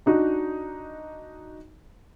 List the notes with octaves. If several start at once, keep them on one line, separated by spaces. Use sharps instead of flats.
D4 D#4 F#4